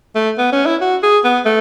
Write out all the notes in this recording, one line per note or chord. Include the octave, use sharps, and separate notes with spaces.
A3
B3
C#4
E4
F#4
G#4
B3
A3